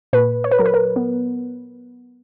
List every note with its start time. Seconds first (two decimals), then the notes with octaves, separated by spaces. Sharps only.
0.13 A#2 B4
0.44 C#5
0.52 B4
0.59 F#3 A#4
0.66 B4
0.74 A#4
0.96 B3